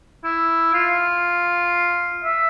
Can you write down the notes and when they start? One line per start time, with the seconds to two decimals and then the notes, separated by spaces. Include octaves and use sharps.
0.24 E4
0.74 F4
2.24 E5